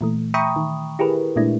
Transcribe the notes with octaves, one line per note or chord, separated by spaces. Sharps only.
A#2 E3 A3
E5 G5 A#5 B5 C#6 D#6
D#3
E4 G4 G#4 A#4 B4
A#2 G#3 A3 D4 E4